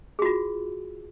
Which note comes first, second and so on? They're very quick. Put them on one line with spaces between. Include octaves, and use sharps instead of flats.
G#4 F#4 F4